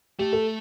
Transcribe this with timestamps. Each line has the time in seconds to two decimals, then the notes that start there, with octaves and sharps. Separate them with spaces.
0.19 A3 G4
0.33 A4